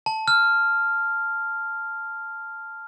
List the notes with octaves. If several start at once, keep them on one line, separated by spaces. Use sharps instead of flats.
A5
F6